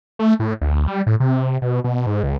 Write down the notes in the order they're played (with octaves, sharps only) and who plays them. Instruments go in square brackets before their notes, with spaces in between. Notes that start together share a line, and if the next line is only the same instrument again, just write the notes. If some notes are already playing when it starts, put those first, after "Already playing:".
[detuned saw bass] A3
A2
D2
G3
A2
C3
B2
B2
G#2
C#2